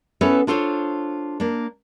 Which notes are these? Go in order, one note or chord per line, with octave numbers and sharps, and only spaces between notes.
B3 C#4 E4 A4 B4 C#5
D4 F4 A4 C5 C#5
A#3 D4